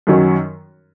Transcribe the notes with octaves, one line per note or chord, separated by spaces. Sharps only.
F#2 D#3 F#3 C#4